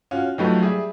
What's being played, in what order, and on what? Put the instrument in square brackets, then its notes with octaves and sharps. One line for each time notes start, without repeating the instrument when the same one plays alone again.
[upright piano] C#4 F4 F#4
[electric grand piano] F3 F#3 A3 [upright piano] D#4 G4 B4
[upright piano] G3 [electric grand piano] G#4 E5